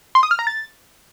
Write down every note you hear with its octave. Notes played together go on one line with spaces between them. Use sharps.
C6
D#6
F6
A#5
A6